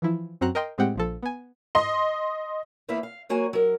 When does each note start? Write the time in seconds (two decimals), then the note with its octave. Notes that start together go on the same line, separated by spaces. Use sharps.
0.02 E3 F3 E4
0.41 F#2 C4 F#4 A#5 F#6
0.55 A#4 D#5 G5 C6
0.78 A2 G#3 C4 G4 F#5 G5
0.96 A#1 F3 A4
1.23 B3 G#5
1.75 D#5 C6
2.88 E2 A#3 B3 E4 E5 F5
3.03 F5
3.29 F#3 A#3 F#4 C#5 G#5
3.53 F#3 A#4